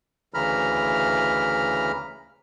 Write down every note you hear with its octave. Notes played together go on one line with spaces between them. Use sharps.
D2 C#3 E3 A#5 B5 F6